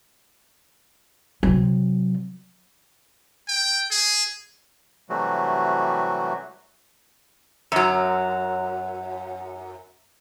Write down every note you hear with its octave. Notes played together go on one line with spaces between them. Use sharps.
C3 F#3
G5
G#4
C3 E3 F#3 G3 A3 F#4
F#2 F#3